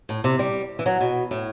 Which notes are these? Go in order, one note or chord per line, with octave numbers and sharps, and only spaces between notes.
A2
C3
G3
E3
F#3
B2
A2